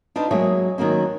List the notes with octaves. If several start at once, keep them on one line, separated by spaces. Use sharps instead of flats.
D4 D#4 F4 B4 C5
F#3 G#3 A#3 G#4 C#5 E5
D#3 F#3 A#3 C#4